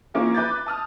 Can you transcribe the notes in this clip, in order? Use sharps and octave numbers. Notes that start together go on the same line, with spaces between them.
E3 F3 A#3 C4 C#4 D#4
B4 D6 G6 A6
A5 D#6 F6